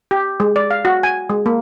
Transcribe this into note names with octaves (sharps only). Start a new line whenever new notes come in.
G4
G#3
D5
F5
F#4
G#5
G#3
A#3